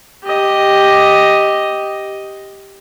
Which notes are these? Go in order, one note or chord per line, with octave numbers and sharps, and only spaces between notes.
G4 D#5